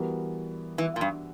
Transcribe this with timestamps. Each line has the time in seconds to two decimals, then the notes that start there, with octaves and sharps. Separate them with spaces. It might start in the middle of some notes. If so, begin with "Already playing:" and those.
Already playing: E3 G3 B3 F#4 A#4
0.78 E3
0.96 A#2
1.01 G2